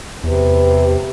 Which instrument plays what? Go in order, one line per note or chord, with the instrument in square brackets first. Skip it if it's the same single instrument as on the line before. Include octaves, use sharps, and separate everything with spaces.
[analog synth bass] E2 [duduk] C3 [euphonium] B4